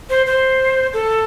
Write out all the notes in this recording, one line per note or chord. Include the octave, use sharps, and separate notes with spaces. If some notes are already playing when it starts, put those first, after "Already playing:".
C5
C5
A4